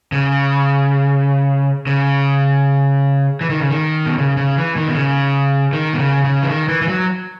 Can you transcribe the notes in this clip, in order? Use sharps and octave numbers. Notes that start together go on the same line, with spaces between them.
C#3
C#3
E3
D#3
C#3
D#3
B2
C#3
C#3
E3
D#3
B2
C#3
D#3
B2
C#3
C#3
E3
D#3
E3
E3
F#3